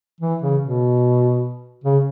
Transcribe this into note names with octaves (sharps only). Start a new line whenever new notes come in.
E3
C#3
B2
C#3